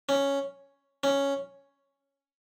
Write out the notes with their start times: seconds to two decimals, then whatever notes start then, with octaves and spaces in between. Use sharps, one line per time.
0.09 C#4
1.03 C#4